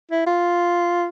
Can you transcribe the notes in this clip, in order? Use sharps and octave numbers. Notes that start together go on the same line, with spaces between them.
E4
F4